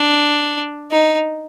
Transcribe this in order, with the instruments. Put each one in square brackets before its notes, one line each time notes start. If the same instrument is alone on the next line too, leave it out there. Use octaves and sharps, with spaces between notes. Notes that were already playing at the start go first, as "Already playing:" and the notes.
Already playing: [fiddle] D4
D#4